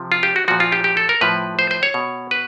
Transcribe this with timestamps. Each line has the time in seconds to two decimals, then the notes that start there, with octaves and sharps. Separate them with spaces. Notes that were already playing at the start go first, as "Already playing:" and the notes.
Already playing: C3 F3
0.12 F4
0.23 G4
0.36 F#4
0.48 A#2 F3 F#4
0.60 F4
0.72 G4
0.84 G4
0.97 A4
1.09 A#4
1.21 A2 F3 B4
1.59 C5
1.71 C5
1.83 C#5
1.94 B2
2.31 B4